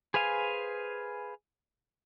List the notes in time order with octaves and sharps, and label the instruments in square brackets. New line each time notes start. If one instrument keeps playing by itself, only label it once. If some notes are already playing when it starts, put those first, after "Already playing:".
[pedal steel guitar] G#4 B4 C5 F5 G#5